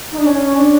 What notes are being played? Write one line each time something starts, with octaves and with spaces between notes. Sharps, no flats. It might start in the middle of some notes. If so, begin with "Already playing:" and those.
D#4
D4
C#4
D4